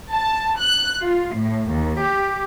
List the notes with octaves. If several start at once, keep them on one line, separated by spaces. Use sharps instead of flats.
A5
F#6
F4
A2
D#2
G4